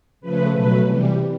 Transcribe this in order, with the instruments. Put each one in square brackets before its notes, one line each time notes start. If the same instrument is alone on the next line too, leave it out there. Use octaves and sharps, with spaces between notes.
[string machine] C#3 F3 A3 B4
B2 F#3 A3 B4
C3 E3 G3